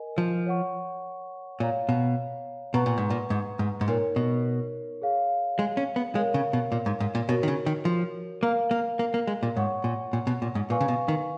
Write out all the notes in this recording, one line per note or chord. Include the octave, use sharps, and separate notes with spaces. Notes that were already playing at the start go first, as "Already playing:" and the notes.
Already playing: A#4 D#5 G#5
F3
C#5 F#5 C#6
A#2 C#5 F5 A#5
B2
B2 B4 F#5 A#5 C#6
A#2
G#2
A#2
G#2
G#2
G#2
A#2 D#4 A#4 C#5
B2
G#4 C#5 F5
G#3
C#4
B3
G#3 A#4 C#5 F5
C#3
B2
A#2
G#2
G#2
A#2
B2 F#4 A#4 C#5
D#3
C#3
D#3
F3
A#3 A#4 F5 A#5
A#3
A#3
A#3
G#3
A#2
G#2 C#5 F#5 C#6
A#2
A#2
B2
A#2
G#2
A#2 B4 F5 G#5 C#6
C#3
B2
D#3